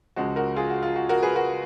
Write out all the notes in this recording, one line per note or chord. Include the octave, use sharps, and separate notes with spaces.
C#2 C#3 F3 G#3 F#4
F#4 A#4
F4 G#4
F#4
F4
F#4
F#4 A#4
G#4 B4
F#4 A#4